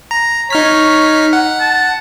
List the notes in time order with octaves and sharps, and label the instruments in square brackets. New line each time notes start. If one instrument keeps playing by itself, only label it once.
[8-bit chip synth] A#5
[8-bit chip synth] D#4 F6 B6 [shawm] C#5
[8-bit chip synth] F#5
[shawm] A5